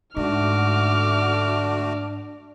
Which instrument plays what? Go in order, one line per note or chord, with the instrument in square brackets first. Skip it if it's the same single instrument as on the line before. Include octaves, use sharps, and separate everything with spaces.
[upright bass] G#2 [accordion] D3 A3 F#4 [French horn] D4 [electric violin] D6 F6